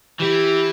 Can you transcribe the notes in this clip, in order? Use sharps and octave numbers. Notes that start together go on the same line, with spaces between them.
E3 G4